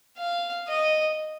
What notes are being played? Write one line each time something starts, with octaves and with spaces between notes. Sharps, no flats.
F5
D#5